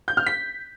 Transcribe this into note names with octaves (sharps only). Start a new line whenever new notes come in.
G6
F6
B6